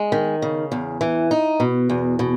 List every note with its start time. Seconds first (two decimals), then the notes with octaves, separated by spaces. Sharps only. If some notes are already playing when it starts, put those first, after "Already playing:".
Already playing: G#3
0.12 D#3
0.42 C#3
0.72 E2
1.01 E3
1.31 D#4
1.60 B2
1.89 E2
2.19 B2